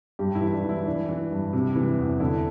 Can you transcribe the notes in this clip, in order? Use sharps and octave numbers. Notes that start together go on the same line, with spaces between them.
G2 G4
E4
E3
E4
D4
E3
E4
E3 D4
E3
G2
C3
E3
E2
D3 E4